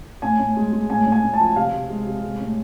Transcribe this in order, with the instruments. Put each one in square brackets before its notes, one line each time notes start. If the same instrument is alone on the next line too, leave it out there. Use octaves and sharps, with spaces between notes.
[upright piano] A2 G#5
A2
G#3
G#3
A2 G#5
A2
G#5
A2
A5
F3
C3 F5
C3
G#3
C3
G#3
A2